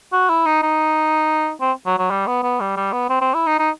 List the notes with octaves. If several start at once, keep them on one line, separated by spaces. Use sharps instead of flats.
F#4
E4
D#4
D#4
C4
F#3
F#3
G3
B3
B3
G3
G3
B3
C4
C4
E4
D#4
D#4